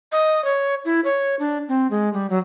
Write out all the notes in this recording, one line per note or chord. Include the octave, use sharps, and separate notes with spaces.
D#5
C#5
E4
C#5
D4
C4
G#3
G3
F#3